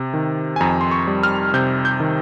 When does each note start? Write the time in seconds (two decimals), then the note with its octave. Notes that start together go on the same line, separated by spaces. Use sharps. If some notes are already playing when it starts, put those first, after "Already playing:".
Already playing: C3
0.14 D#3
0.56 G#5
0.61 F2 A#5
0.81 C6
0.91 C#6
1.07 G3
1.23 F6
1.54 C3 G6
1.85 G6
2.00 D#3